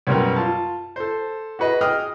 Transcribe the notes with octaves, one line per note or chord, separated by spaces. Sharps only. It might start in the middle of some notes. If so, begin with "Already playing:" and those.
B1 F#2 B2 G3 A#4 G5
F4 A5
A4 C5
F#4 G#4 B4 D#5
G#4 D#5 G5 D#6 F6